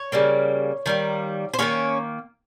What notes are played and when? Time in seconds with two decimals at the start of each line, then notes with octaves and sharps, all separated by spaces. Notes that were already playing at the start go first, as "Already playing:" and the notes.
Already playing: C#5
0.12 C#3 G3 A#3
0.86 D#3 G3 A#3
1.54 C5
1.59 D#3 G3 A#3 C#4 C#5